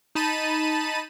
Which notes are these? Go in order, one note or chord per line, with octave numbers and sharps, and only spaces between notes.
D#4 A5 B5 D#7